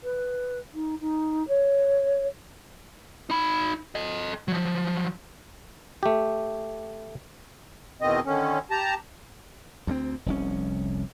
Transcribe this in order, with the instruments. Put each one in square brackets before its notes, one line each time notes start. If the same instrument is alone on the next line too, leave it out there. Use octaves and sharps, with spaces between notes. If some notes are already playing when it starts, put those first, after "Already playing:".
[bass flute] B4
D#4
D#4
C#5
[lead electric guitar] D#4 B5
A4 D#5
F3 F#3
[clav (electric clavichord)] A3 G4
[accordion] E2 B2 D#3 C4 D#5
D3 D#3 C#4
G4 A5 A#5
[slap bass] D2 G3 C4
F1 C2 C#4